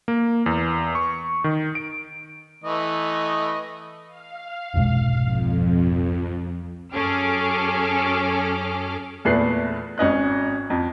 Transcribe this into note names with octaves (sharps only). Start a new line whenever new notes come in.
A#3
E2
C#6
D#3
D7
E3 A3 D#5
F5
F1 B1 G#2
F2
F#2 C#4 G#4 A4 D6 F6
E2 A#2 A3 B4 F#6 C7
G#1 C#4 D#5 F#6
F2